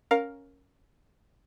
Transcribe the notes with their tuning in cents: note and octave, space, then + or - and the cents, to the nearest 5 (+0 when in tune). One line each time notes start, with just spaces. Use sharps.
C#4 +0 A#4 +0 F5 +15